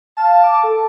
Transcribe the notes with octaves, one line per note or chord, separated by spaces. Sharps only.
F5 A5
D6
A4